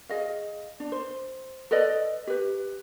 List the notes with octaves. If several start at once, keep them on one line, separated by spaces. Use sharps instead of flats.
G#4 D#5 F5
D4
C5
A4 B4 D5 D#5
G4 B4